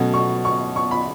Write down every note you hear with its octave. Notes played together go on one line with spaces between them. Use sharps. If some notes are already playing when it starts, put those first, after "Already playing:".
Already playing: B2 F#3 A3 C#4
C#6
C#6
C#6
B5